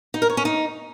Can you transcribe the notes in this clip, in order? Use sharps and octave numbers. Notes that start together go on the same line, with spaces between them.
D#4
A#4
C#5
C#4
D#4